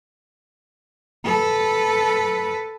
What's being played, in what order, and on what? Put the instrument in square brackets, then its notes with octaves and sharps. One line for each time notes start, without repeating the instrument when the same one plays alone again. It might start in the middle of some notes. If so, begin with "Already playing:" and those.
[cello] A4 B4